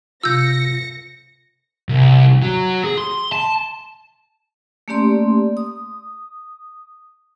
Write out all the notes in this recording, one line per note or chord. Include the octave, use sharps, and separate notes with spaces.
C3 F4 E6 G6 A#6 C#7
C2
F#3
G#4
C6
A5
A3 A#3 C#4 G4 D5 C6
D#6